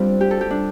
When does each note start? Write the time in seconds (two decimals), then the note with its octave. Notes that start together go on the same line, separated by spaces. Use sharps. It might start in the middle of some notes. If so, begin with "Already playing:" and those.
Already playing: G3 C4 D4 F4
0.21 G4
0.31 A4
0.41 G4
0.50 D4